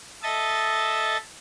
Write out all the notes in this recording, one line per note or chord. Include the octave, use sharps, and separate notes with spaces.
A4 D#5 E5 A6